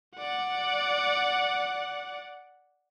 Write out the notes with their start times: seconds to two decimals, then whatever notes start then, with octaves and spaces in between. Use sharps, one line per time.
0.16 D5 F#5